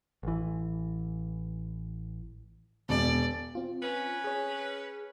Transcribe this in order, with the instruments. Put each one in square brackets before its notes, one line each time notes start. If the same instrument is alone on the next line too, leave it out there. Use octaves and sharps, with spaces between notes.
[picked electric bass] A1 E3
[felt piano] E1 B2 [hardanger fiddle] D5
[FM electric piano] C4 F4
[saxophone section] C#4 B4
[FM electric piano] G#4 C#5